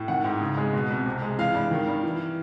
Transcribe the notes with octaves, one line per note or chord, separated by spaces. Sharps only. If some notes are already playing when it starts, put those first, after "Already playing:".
Already playing: A2
D#3 F#5
G#2
C#3
G#3
B2
C2
C3
G#3
E3 F5
G2
D#3
G2
E3